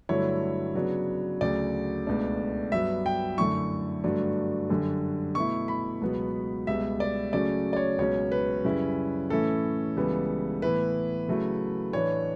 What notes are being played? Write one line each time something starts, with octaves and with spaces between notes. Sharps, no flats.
G2 D3 F#3 A3 E4 C#5
C#3 F#3 B3 D4
D2 C#3 F#3 D5
C#2 B2 A3 D4
G2 F#3 B3 E5
G5
F#2 D3 A3 E4 C#6
G2 D3 F#3 A3 D4
F#2 D3 G3 D4
B2 A3 E4 C#6
B5
C#2 B2 F#3 B3
C#2 B2 G3 E5
D5
C#3 F#3 A3 C#4 D5
D5
C#5
C#2 B2 F#3 C#4 C#5
B4
F#2 C#3 G3 C#4 E4
A2 E3 A3 C#4 E4 A4
C#2 C#3 E3 G3 B3
A2 E3 B3 E4 B4
C#3 F#3 A3 E4
A2 E3 A3 D4 C#5